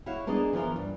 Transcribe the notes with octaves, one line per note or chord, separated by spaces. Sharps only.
E4 F#4 C#5 F5
A#3 B3 D4 G#4 D#5
E3 F3 F4 A#4
G2